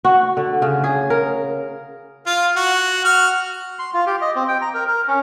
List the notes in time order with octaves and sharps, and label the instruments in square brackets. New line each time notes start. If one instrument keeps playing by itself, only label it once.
[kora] F#4
D3
C#3
G#4
A#4
[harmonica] F4 F5
F#4
F#4 F6
[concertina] C6
F4
G4
D#5
C4
G5
A#5
A#4
A#4
C#4